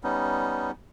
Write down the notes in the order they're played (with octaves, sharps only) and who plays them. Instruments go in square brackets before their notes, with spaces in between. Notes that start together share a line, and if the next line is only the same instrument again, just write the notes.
[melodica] G3 B3 C#4 D#4